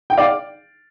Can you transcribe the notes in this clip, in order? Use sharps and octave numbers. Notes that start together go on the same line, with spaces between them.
G5
D5 F5